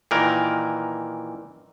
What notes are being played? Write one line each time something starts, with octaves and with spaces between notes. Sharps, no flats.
A#2 D#3 E3 A#4